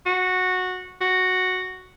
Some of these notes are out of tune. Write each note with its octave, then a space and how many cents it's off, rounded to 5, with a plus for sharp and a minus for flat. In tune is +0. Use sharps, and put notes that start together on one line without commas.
F#4 -10
F#4 +0